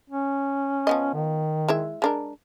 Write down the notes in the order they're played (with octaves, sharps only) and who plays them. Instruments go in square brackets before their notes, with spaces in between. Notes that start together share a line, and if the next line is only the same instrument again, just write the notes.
[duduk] C#4
[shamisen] F3 B3 D#5
[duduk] D#3
[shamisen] G#3 E4 E5
G#3 D4 A#4